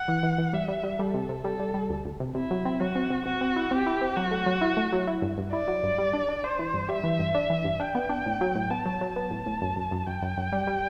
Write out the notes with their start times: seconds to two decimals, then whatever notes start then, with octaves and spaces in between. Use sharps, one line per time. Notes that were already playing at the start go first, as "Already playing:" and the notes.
Already playing: F#5
0.08 E3
0.23 E3
0.38 E3
0.53 G3 E5
0.68 G3
0.83 G3
0.99 G3 A4
1.14 C3
1.29 C3
1.44 G3 A4
1.60 G3
1.74 G3
1.89 D2
2.05 D2
2.20 C3
2.35 C3 E4
2.51 F#3
2.65 C4
2.80 F#3 F#4
2.96 C4
3.10 C3
3.25 C3 F#4
3.41 C4
3.56 E4
3.71 C4 G4
3.87 E4
4.01 C4
4.16 F#3 F#4
4.31 A3
4.46 F#3
4.61 E4
4.77 A3
4.93 F#3
5.07 E4
5.22 G2
5.38 G2
5.53 E4 D5
5.68 F#3
5.83 G2
5.98 G3
6.13 D4
6.29 D4
6.44 D4 C5
6.59 E3
6.74 G2
6.89 G3 E5
7.04 E3
7.19 G2
7.35 D4
7.50 E3
7.64 G2
7.80 D4 G5
7.95 B3
8.09 D4
8.26 A2
8.41 F#3
8.55 A2
8.70 B3 A5
8.86 F#3
9.01 F#3
9.16 B3 A5
9.31 A2
9.46 A2
9.61 F#2
9.76 F#2
9.91 F#2
10.07 F#2 G5
10.22 F#2
10.37 F#2
10.52 G3
10.67 G3